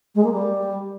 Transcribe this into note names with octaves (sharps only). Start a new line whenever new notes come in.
G#3
A#3
G3